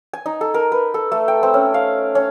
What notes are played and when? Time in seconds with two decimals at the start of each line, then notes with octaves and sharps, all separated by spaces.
0.13 G#5
0.26 D#4
0.41 A4
0.54 A#4
0.72 B4
0.94 A4
1.12 A3
1.28 G5
1.43 C4
1.54 C#4
1.74 F5
2.15 C#4